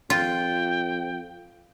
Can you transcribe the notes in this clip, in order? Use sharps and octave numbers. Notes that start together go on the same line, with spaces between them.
F2 F4 G5